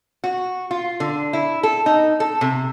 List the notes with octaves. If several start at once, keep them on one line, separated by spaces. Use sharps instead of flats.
F#4
F4
D3
E4
A4
D#4
A4
C3